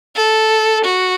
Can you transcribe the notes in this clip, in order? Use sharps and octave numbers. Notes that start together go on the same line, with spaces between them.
A4
F#4